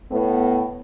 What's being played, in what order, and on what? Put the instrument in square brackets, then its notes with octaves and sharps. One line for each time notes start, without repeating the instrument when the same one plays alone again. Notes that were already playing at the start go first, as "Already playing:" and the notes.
[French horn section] A2 B3